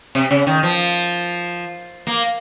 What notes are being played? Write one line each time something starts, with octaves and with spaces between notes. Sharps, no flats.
C3
C#3
D#3
F3
A#3